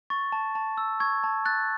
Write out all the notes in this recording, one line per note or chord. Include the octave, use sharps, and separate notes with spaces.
C#6 A6
A5
A5
E6
C#6 G#6
A5
F#6 A6